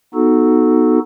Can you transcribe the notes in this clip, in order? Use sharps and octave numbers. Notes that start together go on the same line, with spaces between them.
B3 D#4 F#4 A4